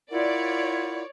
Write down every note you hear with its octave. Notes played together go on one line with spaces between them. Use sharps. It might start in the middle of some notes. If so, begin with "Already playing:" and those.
E4 F4 A#4 C#5 D5 F#5